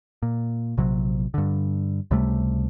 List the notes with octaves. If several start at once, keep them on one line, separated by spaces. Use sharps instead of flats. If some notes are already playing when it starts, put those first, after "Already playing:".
A#2
A#1 C3 F#3
G2 D3
C#2 C3 G3 A3